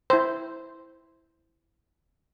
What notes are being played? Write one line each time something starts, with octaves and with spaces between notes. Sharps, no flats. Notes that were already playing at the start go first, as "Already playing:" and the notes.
E4 C5